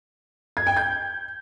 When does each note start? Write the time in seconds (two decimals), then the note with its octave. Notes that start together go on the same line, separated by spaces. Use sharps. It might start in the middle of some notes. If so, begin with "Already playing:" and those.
0.57 G#6
0.67 G5
0.76 G6